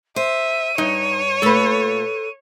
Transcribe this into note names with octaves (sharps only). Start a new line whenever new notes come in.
C5 E5 D#7
G2 D#4 C#5
A#2 A3 A4 B4